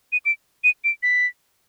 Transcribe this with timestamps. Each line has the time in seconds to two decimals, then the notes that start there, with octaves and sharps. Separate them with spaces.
0.12 D#7
0.26 D7
0.64 D#7
0.84 D7
1.03 B6